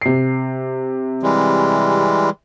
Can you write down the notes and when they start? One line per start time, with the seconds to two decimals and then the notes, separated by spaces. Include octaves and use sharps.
0.02 C3 C7
1.23 E3 G3 G#3